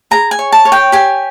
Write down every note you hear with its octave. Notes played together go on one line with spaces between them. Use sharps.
G#4 A#5
G#5
C#5
A5
C#5
G5
G4 G#5